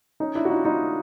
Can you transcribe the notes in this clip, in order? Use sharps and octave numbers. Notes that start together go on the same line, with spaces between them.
C#4 D#4
D4 E4
F#4
D#4 F4
D#4 F4